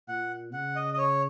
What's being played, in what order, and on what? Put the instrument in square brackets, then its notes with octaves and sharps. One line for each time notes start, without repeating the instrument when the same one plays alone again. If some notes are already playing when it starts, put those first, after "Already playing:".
[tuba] A#2 [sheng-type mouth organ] F#5
[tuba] C#3 [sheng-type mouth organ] F#5
[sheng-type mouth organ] D#5
D#5
C#5